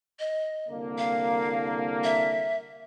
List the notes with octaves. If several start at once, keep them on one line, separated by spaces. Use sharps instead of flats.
D#5
C2 D3 A#3
F5
E5